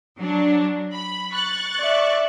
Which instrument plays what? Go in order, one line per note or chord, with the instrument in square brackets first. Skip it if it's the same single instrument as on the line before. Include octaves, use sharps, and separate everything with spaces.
[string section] F#3 D4
B5
C#6 F#6 A6
[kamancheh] D5 E5